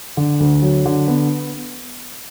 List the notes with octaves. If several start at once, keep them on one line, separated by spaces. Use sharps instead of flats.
D3
D2
F#3
D3
B3